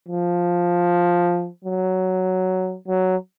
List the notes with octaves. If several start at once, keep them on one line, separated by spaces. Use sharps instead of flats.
F3
F#3
F#3